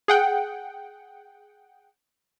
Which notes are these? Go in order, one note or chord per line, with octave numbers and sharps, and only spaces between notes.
G#4 F#5 G5